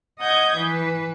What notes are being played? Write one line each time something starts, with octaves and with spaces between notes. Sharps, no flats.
D#5 F#5 D#6 G6 G#6
E3 B4